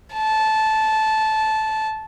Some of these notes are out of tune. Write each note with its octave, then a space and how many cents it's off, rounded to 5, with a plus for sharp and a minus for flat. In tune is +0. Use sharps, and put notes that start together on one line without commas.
A5 -15